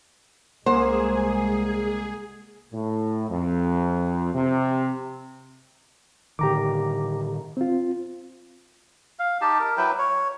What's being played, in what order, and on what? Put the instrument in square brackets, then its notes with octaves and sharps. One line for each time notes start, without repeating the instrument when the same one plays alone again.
[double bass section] C2 G#3 [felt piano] A#3 F#5 [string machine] G#4 [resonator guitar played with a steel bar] C5
[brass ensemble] A2
F2
C3
[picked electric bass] A2 D3 D#3 [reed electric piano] G4 A#5 D6
[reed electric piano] C4 F4
[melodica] F5
D#4 G4 A5
A#4
F#3 E4 B4 G5
C#5